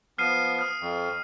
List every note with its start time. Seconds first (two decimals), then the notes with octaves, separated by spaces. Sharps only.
0.18 F3 B3 F6 C7 D#7
0.59 D#6 F6
0.81 F2